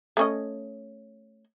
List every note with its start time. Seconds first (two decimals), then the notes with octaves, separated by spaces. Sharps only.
0.17 A3 C#4 D#5